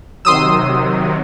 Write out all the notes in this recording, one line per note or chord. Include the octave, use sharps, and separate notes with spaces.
C3 D#3 F#3 C6 D#6 E6